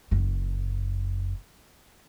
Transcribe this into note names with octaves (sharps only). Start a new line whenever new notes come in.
F#1 F#2